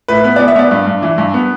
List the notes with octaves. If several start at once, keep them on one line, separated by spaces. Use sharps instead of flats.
A2 B4
B3 B4
B3 D5
E5
B3 D5
G2
G2
E3
G2
B3